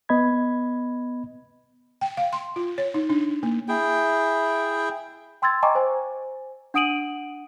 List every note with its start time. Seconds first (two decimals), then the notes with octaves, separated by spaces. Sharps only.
0.09 B3 D#5 B5 G#6
2.01 G5
2.17 F5
2.33 C6
2.56 F4
2.78 C#5
2.94 D#4
3.10 D4
3.43 A#3
3.68 E4 G#4 G5
5.42 G5 C6 E6 G#6 A6
5.63 D#5 G5 G#5 A#5 C#6 D6
5.75 C5 G#5
6.74 D4 F#5 D#6 D7 D#7 F#7